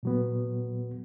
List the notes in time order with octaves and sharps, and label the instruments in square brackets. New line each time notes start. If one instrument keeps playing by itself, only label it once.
[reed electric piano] A#2 F#3 B3